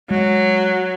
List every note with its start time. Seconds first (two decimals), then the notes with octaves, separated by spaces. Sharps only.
0.11 F#3 G#3